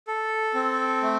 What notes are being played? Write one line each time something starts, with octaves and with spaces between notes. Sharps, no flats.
A4
C4
A3